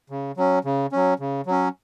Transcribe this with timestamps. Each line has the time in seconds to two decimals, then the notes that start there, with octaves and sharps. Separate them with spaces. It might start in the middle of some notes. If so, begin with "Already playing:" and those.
0.10 C#3
0.37 F#3 C#4
0.65 C#3
0.92 F#3 C#4
1.20 C#3
1.47 F#3 C#4